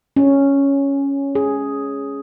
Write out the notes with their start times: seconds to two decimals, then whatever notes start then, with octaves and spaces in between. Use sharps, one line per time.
0.16 C#4
1.35 G#4